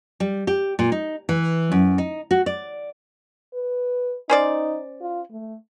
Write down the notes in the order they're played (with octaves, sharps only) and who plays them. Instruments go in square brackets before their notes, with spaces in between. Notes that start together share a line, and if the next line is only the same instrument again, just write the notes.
[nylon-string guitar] G3
G4
A#2
D#4
E3
F#2
D#4
F#4
D5
[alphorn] B4
[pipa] C#4 C5 D5 [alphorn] D#4
[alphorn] F4
A3